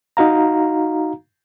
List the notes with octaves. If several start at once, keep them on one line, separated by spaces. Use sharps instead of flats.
D#4 F#4 F5 A#5